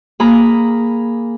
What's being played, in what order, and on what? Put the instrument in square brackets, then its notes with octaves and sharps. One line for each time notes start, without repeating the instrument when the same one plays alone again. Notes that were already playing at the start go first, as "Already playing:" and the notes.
[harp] A#3 G#4 A#5 B5